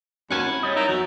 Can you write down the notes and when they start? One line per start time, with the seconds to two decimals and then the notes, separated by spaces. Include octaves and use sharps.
0.30 D#2 C#4 F#4 F#5 G#5 A5
0.45 C4 E4
0.63 G3 C#5 D#5
0.76 D#4 A#4 E5
0.88 E2 F#3